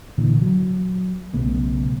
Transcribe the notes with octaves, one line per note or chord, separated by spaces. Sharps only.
A#2 D3 E3
F#3
B1 C#3 A3 B3